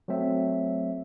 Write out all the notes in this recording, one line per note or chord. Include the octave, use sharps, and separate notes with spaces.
F#3 A3 C4 E5